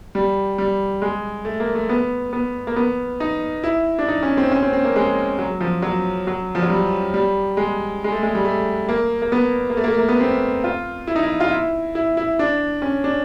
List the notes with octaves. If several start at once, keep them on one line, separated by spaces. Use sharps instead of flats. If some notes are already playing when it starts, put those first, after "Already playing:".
G3
G3
G#3
A3
A#3
A3
B3
B3
A#3
B3
D#4
E4
D4
D#4
C#4
C4
C#4
C4
C4
A#3
G#3
F#3
F3
F#3
F#3
F3
F#3
G3
G3
G#3
G#3
A3
G#3
G3
A3
A#3
A#3
B3
A#3
A3
A#3
A3
A#3
B3
C4
F4
E4
D#4
E4
F4
E4
E4
E4
D4
C#4
D4